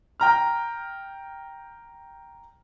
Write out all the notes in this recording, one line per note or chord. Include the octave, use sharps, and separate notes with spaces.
G5 A#5 F6